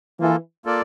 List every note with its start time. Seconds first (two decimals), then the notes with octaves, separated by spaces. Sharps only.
0.20 E3 A#3 F4 A4
0.65 A#3 F4 A4 D5